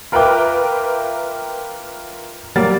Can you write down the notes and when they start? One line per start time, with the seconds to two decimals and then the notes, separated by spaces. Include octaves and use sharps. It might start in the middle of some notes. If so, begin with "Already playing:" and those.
0.12 F4 A#4 B4 E5 G5 D6
2.56 F#3 G3 A#3 A6